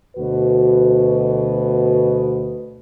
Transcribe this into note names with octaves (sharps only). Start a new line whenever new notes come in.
D2 B2 F#4 B4